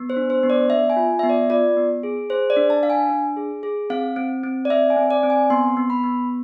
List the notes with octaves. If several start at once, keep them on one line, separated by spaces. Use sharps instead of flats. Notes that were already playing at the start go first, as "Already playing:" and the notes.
Already playing: B3
C5
D4
C5
B3
D5
B3 E5
G#5
F4
B3 E5
D5
F4 D5
B3
G#4
G#4 C5
D5
D4
A5
D4 F5
G#5
D4
G#4
G#4
C4 F5
C4
C4
D5
C4 E5
G#5
C4
D5
C4
G#5
B3 C6
B3
B5
B3